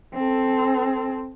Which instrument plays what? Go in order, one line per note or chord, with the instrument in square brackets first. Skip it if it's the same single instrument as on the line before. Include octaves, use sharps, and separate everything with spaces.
[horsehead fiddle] C4 A4